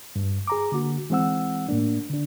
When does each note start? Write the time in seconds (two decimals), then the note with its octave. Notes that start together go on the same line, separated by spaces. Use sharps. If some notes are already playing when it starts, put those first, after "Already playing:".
0.16 G2
0.47 G#4 A#5 D6
0.72 D3 A#3 F#4
1.10 E3 G#3 C4 F#5 E6
1.69 A2 A#3 D4
2.10 D3 D4